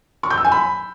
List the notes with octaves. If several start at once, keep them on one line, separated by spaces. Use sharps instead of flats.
C#6
G6
E6
G#5
B5